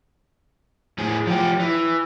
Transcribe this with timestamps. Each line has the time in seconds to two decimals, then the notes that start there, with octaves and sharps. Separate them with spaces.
0.99 A2 G#4
1.28 F3 G4
1.60 E3